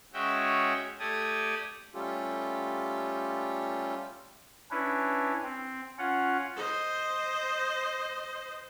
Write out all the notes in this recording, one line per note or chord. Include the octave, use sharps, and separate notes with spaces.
G#3 C#4 F#4 C#5 E5 G5
A3 G4 A4 D5 D#6 G#6
G3 A3 C#4 F4 G4 A4
C#4 D4 E4 B4
C4
C#4 F4 F#5
C5 D#5